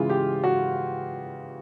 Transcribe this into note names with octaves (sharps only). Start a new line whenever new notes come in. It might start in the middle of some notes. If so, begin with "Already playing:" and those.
Already playing: C#3 E3 G#3 F4
G4
F#4